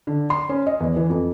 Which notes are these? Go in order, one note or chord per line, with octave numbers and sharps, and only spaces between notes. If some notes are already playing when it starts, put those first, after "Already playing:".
D3
C6
C#4
D#5
E2
E3
F2